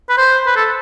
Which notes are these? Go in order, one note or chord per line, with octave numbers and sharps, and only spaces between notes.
B4
C5
B4
A4